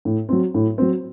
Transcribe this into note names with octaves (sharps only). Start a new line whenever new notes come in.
A2
F#3 C4
A2
F#3 C4